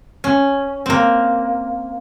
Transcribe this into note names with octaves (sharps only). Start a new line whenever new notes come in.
C#4
A#3 C4